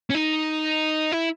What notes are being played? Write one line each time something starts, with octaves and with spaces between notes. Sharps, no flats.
C#4
D#4
E4